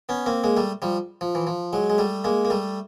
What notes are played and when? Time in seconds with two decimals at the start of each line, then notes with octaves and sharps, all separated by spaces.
0.09 B3 C#4
0.26 A#3 C4
0.44 G#3 A#3
0.57 G3 A3
0.82 F3 G3
1.21 F3
1.35 E3
1.47 F3
1.73 F#3 G#3
1.90 G#3
1.98 G3 A3
2.24 G#3 A#3
2.45 A#3
2.50 G3 A3